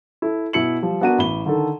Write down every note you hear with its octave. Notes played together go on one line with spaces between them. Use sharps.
E4 A4
B2 E4 C#7 F#7
F3 G3
B3 D4 F#4 A#4 D#7
A1 B5 G7
D3 D#3 A4